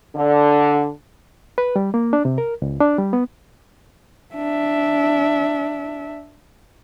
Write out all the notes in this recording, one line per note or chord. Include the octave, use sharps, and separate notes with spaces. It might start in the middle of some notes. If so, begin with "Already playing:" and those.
D3
B4
G3
A#3
D4
C3
A#4
C#2
D4
G3
B3
D4 E5